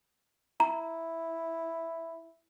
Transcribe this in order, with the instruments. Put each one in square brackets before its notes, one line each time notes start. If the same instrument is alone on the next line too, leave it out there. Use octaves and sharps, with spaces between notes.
[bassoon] E4 [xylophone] A#5